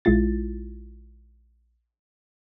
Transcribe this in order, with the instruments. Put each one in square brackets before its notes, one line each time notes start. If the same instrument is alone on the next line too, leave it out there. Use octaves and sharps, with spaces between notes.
[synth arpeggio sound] A#1 G#3 E4 F4 A6